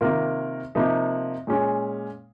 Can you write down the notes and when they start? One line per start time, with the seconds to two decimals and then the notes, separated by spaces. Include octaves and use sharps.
0.01 C3 D#3 A#3 F4 A#4
0.75 C3 F3 A#3 D#4
1.47 A#2 G#3 C#4